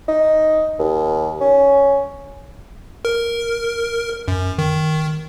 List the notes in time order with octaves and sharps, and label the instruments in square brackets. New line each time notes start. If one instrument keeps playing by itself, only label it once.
[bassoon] D#4
D#2
C#4
[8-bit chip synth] A#4
F#2
D#3